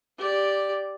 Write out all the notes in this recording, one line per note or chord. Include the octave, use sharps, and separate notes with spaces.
G4 D5